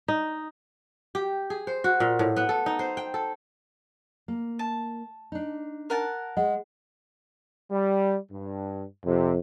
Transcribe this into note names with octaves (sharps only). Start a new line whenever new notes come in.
D#4
G4
G#4
C5
F#4
A#2
A2
B3
A4
D#4
C5
G5
A4
A#3
A5
D4 D#4
A#4 F#5 A5
G#3 D#5 F#5
G3
G2
F2 C3